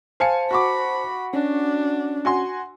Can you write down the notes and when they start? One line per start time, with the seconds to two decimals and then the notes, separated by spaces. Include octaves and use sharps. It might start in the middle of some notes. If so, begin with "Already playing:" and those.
0.20 C5 F5 G#5 A5 C#7
0.51 F#4 B5 C#6 D6
1.34 C#4 D4
2.25 F#4 G#5 C6